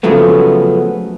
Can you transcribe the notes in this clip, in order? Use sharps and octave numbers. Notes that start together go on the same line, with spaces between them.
C#3 F3 F#3 A3 B3